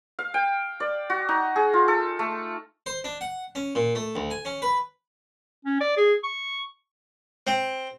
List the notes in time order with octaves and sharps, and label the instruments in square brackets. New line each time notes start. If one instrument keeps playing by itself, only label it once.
[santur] F5
G5
D5
F#4
D#4
G#4
F4
A4
A3
[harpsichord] C5
D4
F#5
C#4
A#2
A3
D2
G#5
C#4
B4
[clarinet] C#4
D5
G#4
C#6
[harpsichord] C4